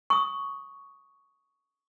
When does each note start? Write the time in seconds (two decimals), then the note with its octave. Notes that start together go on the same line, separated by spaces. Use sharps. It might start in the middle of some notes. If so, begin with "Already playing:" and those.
0.10 C#6 D#6